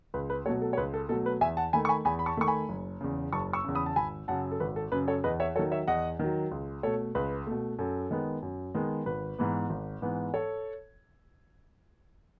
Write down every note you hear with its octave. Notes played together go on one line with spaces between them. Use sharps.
C#2 B4
B4
B2 F#3 A3 A4 C#5
A4
C#5
C#2 B4
A4
B2 F#3 A3 A4
B4
E2 E5 G#5
F#5 A5
D#3 A3 G#5 B5
C#6
G#5 B5
E2 G#5 B5
B5
A5 C#6
D#3 A3 C#6
G#5 B5
F#1
E2 C#3
F#1 A5 C#6
C#6 E6
E2 C#3
B5 D#6
A5
G#1 G#5 B5
F#2 C#3 F#5 A5
A4
G#1 B4
A4
F#2 C#3 B4
A4 C#5
E2 B4 D#5
C#5 E5
D#3 F#3 A4 C#5
C#5 E5
E2 D#5 F#5
D#3 F#3
C#2
B2 A3 A4 C#5
C#2 B4
B2 A3
F#2 A4
D#3 G#3 B3
F#2
D#3 G#3 B3
G#1 B4
G#2 E3 B3
G#1
G#2 E3 B3
A4 C#5